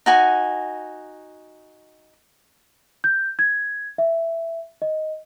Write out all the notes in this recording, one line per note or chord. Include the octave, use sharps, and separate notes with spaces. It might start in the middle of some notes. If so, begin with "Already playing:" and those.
D#4 F#4 G#5
G6
G#6
E5
D#5